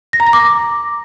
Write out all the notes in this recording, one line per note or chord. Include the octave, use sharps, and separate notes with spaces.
A#6
A#5
A#6
D6